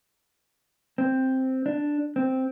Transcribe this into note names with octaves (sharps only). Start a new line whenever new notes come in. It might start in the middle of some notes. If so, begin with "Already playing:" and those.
C4
D4
C4